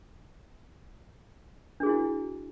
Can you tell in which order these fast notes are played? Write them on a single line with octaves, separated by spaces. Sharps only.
D4 G#4 F#4 E4